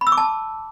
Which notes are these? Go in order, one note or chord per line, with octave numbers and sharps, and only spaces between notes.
B5
E6
D6
A5